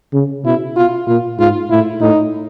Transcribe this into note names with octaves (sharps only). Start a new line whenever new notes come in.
C#3
B2 E4
B2 F4
A#2 F4
G#2 F4
A2 E4
A2 D#4